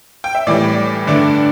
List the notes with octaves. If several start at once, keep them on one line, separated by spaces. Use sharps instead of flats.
G5
E5
A2 E3 G3 D5
G2 D3 A3 D4